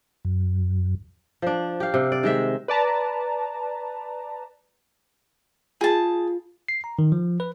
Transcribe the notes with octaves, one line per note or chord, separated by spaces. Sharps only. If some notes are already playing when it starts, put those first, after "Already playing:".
F#2
F3 D4
G4 F5
C3
D5
D#3 G#3 E5
B4 D5 A5 A#5
F4 G#4 A5
C7
A#5
D#3
F3
B4